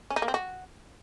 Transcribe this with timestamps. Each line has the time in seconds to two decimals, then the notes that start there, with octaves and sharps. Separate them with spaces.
0.10 C#4
0.16 D#4
0.22 A#3
0.28 C4
0.34 F#4